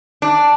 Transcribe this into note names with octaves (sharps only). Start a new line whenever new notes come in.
D4